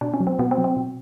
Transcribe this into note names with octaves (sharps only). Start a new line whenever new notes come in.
B2 D4
C#4
F#3
C4
B2 B3
C4
F#3
C4
B2